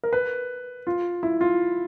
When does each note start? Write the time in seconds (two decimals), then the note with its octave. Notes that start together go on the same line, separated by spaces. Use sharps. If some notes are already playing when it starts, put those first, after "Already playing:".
0.04 A#4
0.13 B4
0.87 F4
1.23 E4
1.41 F4